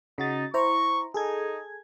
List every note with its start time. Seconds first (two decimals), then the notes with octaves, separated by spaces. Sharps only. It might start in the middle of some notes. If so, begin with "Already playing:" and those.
0.18 C#3 D#4 F#4 A6
0.54 E4 C5 A#5 C#6
1.14 D#4 G#4 A4 G#6